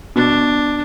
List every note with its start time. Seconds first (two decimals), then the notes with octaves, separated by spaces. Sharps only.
0.16 B2 D4